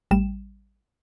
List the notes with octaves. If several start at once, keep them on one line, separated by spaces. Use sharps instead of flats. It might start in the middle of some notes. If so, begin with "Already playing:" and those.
A1 G3 E7